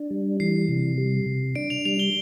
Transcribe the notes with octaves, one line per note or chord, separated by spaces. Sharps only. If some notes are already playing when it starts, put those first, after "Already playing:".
Already playing: D4
G3
E3 C7
C3
G3
C3
D4 D7
F7
G3 F7
G7